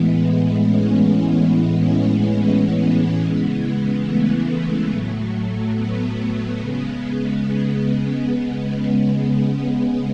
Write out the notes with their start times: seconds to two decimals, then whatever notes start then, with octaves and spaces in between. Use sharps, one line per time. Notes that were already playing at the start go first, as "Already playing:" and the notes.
Already playing: A2 E3 G#3 B3
0.24 B3
0.66 C#4
1.51 A2 E3 G#3 B3
1.79 C#4
2.07 B3
2.36 B3
3.21 C#3 E3 G#3
4.05 A3
4.90 A2 F#3
5.75 B3
6.60 C#3 G#3
7.44 B3
8.29 C#3 G#3
9.56 B3